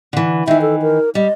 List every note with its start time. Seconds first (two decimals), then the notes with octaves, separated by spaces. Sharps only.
0.13 D3 E3
0.47 D#3 E3 E5
0.62 A4
0.82 A#4
1.15 G3 D#5